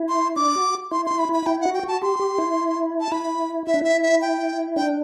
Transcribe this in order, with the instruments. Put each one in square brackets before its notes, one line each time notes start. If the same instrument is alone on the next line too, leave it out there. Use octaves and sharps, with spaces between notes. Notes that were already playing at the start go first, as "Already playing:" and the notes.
Already playing: [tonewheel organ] E4
[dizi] C6
[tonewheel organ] D4 [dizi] D6
[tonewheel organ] F#4
[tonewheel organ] E4 [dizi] C6
[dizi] C6
[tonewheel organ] E4
[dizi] B5
[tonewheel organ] E4 [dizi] B5
[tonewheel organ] E4 [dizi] G5
[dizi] F#5
[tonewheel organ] F#4
[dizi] G5
[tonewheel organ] F#4 [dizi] A5
[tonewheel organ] G4 [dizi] C6
[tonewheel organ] G4
E4
[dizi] A5
[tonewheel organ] E4 [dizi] B5
[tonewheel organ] E4 [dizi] E5
[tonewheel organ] D4
[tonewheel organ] E4 [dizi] E5
[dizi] E5
G5
[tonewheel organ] D4 [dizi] G5